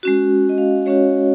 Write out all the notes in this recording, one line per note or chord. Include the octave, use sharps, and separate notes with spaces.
G#3 C#4 F#4
D#5
F5
G#3 C#4 F#4 C#5